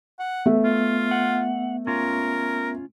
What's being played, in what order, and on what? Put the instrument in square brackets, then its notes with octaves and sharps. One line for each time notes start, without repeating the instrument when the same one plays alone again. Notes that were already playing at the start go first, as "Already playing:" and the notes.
[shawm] F#5
[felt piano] A3 [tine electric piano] B3 E5
[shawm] F4
[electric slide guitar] F#5
[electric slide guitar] C#4 F4 [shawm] A#4